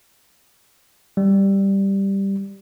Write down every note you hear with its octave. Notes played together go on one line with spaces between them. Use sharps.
G3